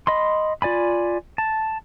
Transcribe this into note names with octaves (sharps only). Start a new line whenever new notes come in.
D#5 B5 C6
F4 D5 G#5 B5
A5